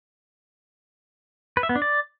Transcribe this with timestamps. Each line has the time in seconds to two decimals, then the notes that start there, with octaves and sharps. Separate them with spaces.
1.57 B4
1.63 E5
1.69 B3
1.76 D4
1.82 D5